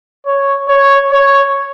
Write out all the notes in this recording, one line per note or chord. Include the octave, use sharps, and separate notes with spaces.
C#5
C#5
C#5